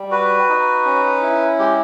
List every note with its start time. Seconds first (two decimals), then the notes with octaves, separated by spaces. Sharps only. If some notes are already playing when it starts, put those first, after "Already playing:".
Already playing: G3
0.11 F#4 B4
0.49 D#4
0.85 C#4
1.22 E4
1.59 G#3 G4